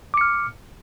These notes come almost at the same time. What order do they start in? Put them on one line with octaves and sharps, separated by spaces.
D6 C#7 F6